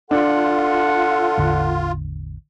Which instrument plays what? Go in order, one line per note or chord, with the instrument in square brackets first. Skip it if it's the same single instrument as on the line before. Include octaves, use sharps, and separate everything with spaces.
[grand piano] D4 [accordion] F4 [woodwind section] A4 F#5
[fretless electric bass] A1 E2 D3